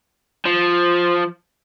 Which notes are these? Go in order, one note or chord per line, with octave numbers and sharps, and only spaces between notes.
F3